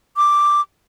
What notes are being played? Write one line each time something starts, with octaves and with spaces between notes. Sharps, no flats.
D6